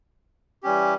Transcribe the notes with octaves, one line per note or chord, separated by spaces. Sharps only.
E3 G3 C#4 G4